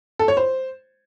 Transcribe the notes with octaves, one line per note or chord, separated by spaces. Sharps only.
A4
C#5
C5